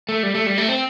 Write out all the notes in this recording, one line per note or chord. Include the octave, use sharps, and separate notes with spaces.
A3
G3
A3
G3
A3
C4